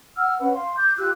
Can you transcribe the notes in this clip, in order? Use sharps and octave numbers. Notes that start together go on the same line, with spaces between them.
F#5 E6 F6
C#4 B4 F#5
F5 C6
D6 G6
F4 G4 E6 F#6